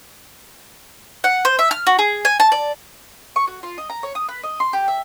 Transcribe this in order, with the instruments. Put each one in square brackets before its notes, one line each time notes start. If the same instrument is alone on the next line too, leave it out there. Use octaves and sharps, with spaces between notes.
[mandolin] F#5
C5
E5
F6
F#4
G#4
G#5
A5
D5
C#6
F#4
F4
D#5
A#5
C#5
D#6
B4
D#5
C6
G4
E5